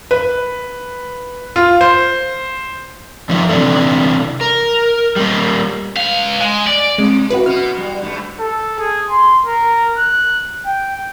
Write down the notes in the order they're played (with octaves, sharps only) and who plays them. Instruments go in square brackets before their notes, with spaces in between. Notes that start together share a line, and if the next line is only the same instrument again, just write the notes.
[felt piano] B4
F4
C5
[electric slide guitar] F#2 F3 D#4 E5
C3 E3 G#3 D4 A4
A#4
G3 A#3
[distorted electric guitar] C#2 F5
G#3
D5
[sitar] C3 [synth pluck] G#3
[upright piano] E4 F#4 F#5 [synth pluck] B4
[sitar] F#2 B2 B3 [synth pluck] F6
[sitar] G3
G2 A3
[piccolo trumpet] A4
G#4
C6
A#4
F#6
G5